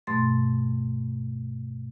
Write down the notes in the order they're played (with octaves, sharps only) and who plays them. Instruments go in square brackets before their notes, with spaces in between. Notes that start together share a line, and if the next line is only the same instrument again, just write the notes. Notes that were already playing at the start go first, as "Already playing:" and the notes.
[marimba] G2 B2 A3 C6 A6